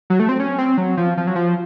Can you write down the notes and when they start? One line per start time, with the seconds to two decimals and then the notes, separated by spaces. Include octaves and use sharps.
0.10 F#3
0.19 A3
0.29 C4
0.40 C#4
0.58 C4
0.78 F#3
0.97 F3
1.17 F3
1.27 F#3
1.36 F3